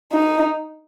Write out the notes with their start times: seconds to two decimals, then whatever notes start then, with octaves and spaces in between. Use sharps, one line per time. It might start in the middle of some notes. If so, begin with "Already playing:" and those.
0.12 D#4